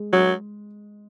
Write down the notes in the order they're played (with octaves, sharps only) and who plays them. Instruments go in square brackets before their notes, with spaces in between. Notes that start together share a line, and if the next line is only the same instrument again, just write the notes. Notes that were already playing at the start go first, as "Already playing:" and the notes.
Already playing: [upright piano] G#3
[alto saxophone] F#3